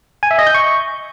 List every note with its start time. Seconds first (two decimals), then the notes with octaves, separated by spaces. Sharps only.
0.23 G#5
0.31 E5
0.39 D#5
0.47 G6
0.55 C#6